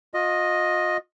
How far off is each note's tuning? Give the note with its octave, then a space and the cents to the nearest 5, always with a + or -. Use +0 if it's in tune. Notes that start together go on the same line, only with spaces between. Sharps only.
F4 +35 D#5 +0